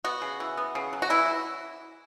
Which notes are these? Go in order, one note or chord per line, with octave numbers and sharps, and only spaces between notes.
B3 F#4
C#3
E3
B3
C#3
F#3
F#4
E3 E4